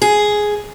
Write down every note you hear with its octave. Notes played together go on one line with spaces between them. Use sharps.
G#4